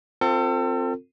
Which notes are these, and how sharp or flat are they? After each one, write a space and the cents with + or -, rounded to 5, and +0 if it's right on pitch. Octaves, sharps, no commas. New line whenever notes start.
C4 +0 F4 +10 A4 +35